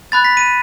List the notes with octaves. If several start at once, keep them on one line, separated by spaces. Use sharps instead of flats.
B5 F#6 A6
B6
D#7